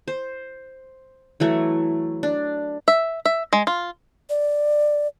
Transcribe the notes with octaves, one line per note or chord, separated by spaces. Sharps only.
C5
E3 F#3 A3
D4
E5
E5
G#3
F4
D5